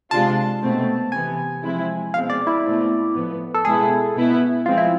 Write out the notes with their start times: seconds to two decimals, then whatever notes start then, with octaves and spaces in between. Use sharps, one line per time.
0.11 C3 G#3 D4 F4 A5
0.62 B2 A3 C4
1.12 C3 E3 B3 G#5
1.63 F3 G#3 C4 E4
2.14 B2 G#3 C4 F5
2.30 D5
2.47 E4
2.64 B2 A3 C4
3.14 A2 F3 B3
3.54 A4
3.65 B2 G#3 B3 E4 G#4
4.15 B2 B3 E4
4.66 F3 G#3 C4 F4
4.78 E4